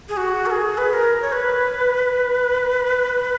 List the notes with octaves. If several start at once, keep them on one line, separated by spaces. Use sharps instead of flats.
G#4
F#4
A#4
G#4
B4
B4
A#4
C#5
B4